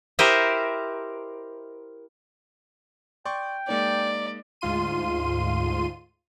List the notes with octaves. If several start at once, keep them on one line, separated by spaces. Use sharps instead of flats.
E4 G4 A#4 C5 D#5 E5
D5 G5 C6 C#6
G#3 A#3 D#4 D5
D2 G#2 F4 C6 D#7